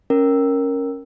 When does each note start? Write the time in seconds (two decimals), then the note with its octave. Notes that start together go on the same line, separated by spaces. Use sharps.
0.10 C#4 A#4